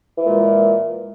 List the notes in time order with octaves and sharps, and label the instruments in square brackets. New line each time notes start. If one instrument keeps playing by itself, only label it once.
[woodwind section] E3
G#3
A#2